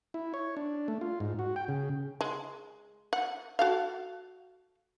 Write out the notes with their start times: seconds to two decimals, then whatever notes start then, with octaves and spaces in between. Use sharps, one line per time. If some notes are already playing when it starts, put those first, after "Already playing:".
0.14 E4
0.34 C#5
0.57 D4
0.88 A3
1.01 F4
1.20 G#2
1.39 F#4
1.56 G5
1.68 C#3
2.21 G#3
3.13 F#5
3.59 F#4 A4 F5